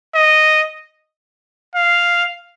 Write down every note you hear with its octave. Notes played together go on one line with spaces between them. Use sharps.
D#5
F5